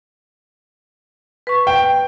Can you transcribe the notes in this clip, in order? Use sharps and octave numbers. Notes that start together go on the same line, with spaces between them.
B4 C#6
G5